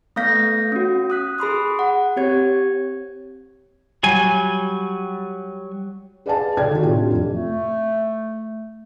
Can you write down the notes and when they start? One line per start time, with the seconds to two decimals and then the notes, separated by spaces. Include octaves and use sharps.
0.16 A3 B3 F5 G6 A#6 B6
0.72 C#4 F#4
1.10 D#6 F#6 B6
1.38 G#4 B5 C6 D#6
1.79 F#5
2.16 C4 G4 C#5 G#6
4.03 F#3 G3 G#5
6.26 G#4 B4 D5 F5 G#5 A5
6.57 C#3 A4 D5 G5 G#6
6.71 D#3 F#4
6.83 A2 C3 D4 F4 G4
7.11 F2
7.32 A3